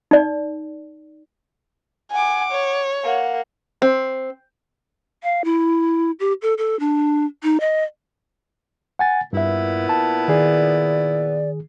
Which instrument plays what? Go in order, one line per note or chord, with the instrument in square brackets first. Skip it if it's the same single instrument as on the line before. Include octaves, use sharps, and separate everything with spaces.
[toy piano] D#4 D5
[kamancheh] F#5 D6 [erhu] G#5
[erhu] C#5
[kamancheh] A#3 F#5
[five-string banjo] C4
[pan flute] F5
E4
G4
A4
A4
D4
D#4
D#5
[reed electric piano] F#5 G#5 A6
[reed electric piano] G2 E5 [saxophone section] A#2 B3 E4
[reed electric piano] A5
[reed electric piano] D#3 G#4 [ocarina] D5